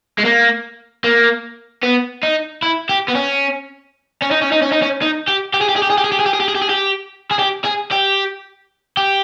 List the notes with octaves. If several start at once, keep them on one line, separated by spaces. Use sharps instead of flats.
G#3
A#3
A#3
B3
D#4
E4
G4
B3
C#4
C#4
D#4
C#4
D#4
C#4
D#4
C#4
D#4
G4
G4
G#4
G4
G#4
G4
G#4
G4
G#4
G4
G#4
G4
G#4
G4
G#4
G4
G#4
G4
G#4
G4
G#4
G4
G4